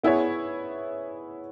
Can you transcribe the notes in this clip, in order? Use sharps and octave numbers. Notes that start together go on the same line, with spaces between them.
B3 E4 G#4 C#5